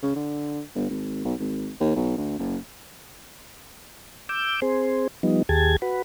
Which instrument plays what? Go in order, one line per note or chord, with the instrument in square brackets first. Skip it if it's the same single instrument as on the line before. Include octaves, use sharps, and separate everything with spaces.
[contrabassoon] C#3
D3
G1
G#1
B1
G#1
D#2
B1
D2
F#1
[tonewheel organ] D6 E6 G6
C4 G#4 C5
F3 G3 B3 D#4
D#2 G4 G#4 A5 G#6
F#4 B4